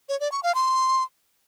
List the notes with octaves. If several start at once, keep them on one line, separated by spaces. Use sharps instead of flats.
C#5
D5
C#6
F5
C6